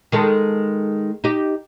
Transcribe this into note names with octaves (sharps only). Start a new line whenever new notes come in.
D#3 G#3 A4
D#4 G4